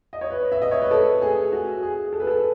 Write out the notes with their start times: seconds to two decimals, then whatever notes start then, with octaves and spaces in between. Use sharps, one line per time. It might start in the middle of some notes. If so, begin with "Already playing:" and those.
0.13 D#5
0.21 C#5
0.30 B4
0.52 E5
0.62 D#5
0.71 C#5
0.81 B4
0.91 A4
1.22 G#4
1.52 F#4
1.82 G#4
2.13 A4
2.20 B4
2.27 A4